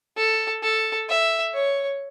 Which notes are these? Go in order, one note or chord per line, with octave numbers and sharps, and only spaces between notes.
A4
A4
E5
C#5